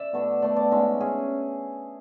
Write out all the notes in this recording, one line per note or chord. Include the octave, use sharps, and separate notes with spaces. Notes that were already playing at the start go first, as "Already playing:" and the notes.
Already playing: D5 E5
B2 A3 D4
B2 A3 D4 D5
D5
G#2 G#3 C#4 E5
C#4 G#4